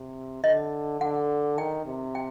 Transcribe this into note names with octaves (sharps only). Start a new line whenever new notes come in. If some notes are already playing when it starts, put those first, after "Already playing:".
Already playing: C3
D3 D#5
D3 F#5
D#3 G5
C3
G5